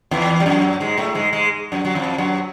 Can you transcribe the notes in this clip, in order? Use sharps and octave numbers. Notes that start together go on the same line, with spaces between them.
E2 E3
G3
F#2 F#3
G#2 G#3
A2 A3
G#2 G#3
G#2 G#3
F#2 F#3
F#3
F2 F3
F#2 F#3